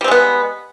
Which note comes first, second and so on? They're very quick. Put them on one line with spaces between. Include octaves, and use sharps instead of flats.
G3 C4 G#3 B3